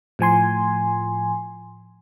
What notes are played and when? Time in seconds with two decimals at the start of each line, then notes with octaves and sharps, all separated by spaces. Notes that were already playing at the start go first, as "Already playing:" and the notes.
0.19 A2 F3 G#5 C6